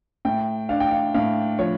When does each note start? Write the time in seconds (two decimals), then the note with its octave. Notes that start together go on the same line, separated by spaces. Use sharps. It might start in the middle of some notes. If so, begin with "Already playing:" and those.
0.25 A2 G5
0.69 D4 F5
0.80 G5
0.91 F5
1.14 A2 F5
1.59 F3 C#5